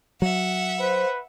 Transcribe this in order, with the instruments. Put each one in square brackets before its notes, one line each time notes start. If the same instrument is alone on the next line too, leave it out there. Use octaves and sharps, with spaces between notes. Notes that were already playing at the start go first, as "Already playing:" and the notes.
[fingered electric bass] F#3 [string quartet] E5 F#5
[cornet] B4 [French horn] C5